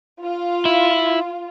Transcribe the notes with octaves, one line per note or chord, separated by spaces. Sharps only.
F4
E4